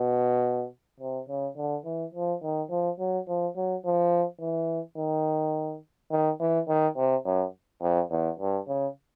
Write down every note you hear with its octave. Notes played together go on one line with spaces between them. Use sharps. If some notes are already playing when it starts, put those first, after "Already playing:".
Already playing: B2
C3
C#3
D3
E3
F3
D#3
F3
F#3
F3
F#3
F3
E3
D#3
D#3
E3
D#3
C3
F#2
F2
E2
G2
C#3